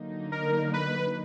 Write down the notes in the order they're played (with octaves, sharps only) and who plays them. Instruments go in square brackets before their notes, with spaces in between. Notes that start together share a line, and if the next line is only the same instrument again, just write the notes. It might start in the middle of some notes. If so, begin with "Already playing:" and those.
Already playing: [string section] D3 F#3 A#3 D#4
[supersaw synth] A#4
B4